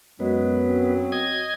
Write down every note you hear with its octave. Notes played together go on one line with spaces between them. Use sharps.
F#2 F#3 G#3 B3
C4
D#5 G#6